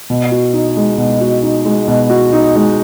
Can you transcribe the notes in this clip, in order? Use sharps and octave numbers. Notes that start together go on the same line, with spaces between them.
B2
F#4
D#4
G#3
B2
F#4
D#4
G#3
B2
F#4
D#4
G#3